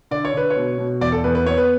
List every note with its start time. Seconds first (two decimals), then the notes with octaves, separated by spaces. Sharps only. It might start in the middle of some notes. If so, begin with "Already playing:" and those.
0.11 D3 D5
0.25 C#5
0.33 D3 B4
0.50 C#5
0.56 B2
0.78 B2
1.01 E2 D5
1.12 A4
1.24 E2 B4
1.35 B4
1.46 B3 C#5
1.57 B4